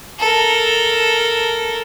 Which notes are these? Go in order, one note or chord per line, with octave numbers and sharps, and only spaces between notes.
A4 A#4